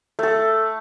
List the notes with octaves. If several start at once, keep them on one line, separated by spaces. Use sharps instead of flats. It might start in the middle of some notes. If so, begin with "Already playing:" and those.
A3 A4